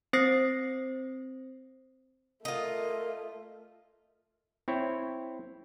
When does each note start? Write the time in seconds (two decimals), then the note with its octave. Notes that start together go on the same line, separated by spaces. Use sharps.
0.13 C4 C5 D#6 A#6 C7
2.45 A3 F4 A#4 D#5
4.68 C4 E4 C#5